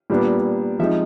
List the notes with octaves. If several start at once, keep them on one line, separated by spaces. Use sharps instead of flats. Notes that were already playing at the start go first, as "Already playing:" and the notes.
A#2 G3 B3 D4
F3 G#3 C4 D#4 E5